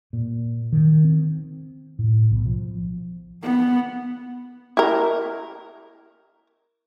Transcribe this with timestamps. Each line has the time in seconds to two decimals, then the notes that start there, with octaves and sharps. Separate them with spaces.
0.13 A#2
0.73 D#3
1.05 C4
1.99 A2
2.32 B1
2.46 F3
3.43 B3
4.77 E4 A#4